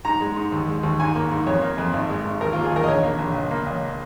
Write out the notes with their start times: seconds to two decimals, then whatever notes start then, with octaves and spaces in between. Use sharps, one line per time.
0.05 G#2 A#5
0.21 G#3
0.36 G#2
0.52 D#2
0.68 G#3
0.83 D#2
0.99 G#2 G#5
1.15 A#3
1.31 G#2
1.47 F2 C#5
1.62 A#3
1.78 F2
1.93 G#1
2.09 G#3
2.25 G#1
2.41 D#2 A#4
2.53 F4
2.56 A#3
2.64 G#4
2.72 D#2 A#4
2.83 D#5
2.88 A#1 C#5
3.03 A#3
3.19 A#1
3.34 C#2
3.51 A#3
3.66 C#2